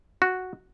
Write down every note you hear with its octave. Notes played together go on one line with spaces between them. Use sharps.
F#4